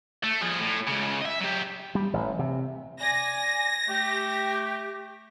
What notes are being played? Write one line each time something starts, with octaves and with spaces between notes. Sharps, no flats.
A3
F3 G#4
A2
C#2 C#3
D#5 E5
F#3 G4
G3
A1
C3
D5 G#5 A#6
A3 G4